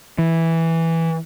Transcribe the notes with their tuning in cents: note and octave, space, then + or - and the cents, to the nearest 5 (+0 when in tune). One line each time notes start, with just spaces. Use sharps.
E3 -5